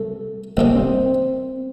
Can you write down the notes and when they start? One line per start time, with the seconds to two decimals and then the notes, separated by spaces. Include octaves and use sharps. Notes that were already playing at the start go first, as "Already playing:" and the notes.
Already playing: C2 A3
0.57 C2 C3 D#3 A#3
0.76 C4